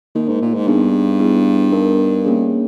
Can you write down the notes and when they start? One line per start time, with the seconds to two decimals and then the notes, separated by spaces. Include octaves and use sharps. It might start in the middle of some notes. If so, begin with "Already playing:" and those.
0.15 D#3 A#3 D#4 A#4
0.28 G#2
0.42 A#2
0.54 G#2
0.68 G2 B3 D#4 G#4
1.19 B3 E4 G#4
1.72 B3 D#4 A#4
2.25 A#3 C#4 G#4